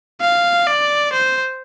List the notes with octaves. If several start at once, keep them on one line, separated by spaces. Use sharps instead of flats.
F5
D5
C5